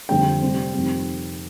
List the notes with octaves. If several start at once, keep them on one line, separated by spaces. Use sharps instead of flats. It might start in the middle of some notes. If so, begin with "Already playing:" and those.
F2 D3 G3 C4 G5
C3 G3 C4
F2 D#3 G3 C4